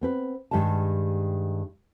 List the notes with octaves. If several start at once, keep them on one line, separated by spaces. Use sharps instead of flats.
B3 C4 B4
G2 D#3 G3 G#3 A5